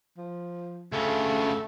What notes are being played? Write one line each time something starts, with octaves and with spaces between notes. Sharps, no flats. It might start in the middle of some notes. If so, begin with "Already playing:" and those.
F3
D2 C#3 A3